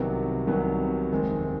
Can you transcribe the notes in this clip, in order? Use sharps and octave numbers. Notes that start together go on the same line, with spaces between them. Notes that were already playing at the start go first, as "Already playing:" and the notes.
Already playing: C2 C3 D#3 F#3 B3
C2 C3 D#3 F#3 B3
F1 D#2 D#3 G#3 C4